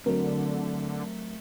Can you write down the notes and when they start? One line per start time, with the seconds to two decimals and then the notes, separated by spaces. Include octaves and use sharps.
0.06 D3 F#3 A3 C4 A#4